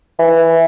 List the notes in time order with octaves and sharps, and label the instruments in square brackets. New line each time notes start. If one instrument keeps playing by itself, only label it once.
[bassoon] E3